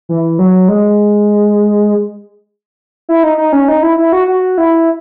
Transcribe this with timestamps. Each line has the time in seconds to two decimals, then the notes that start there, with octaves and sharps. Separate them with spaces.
0.09 E3
0.39 F#3
0.68 G#3
3.09 E4
3.23 D#4
3.38 D#4
3.53 C#4
3.68 D#4
3.83 E4
3.97 E4
4.13 F#4
4.28 F#4
4.58 E4